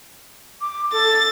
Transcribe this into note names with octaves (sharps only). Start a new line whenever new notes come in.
D6
A4 A6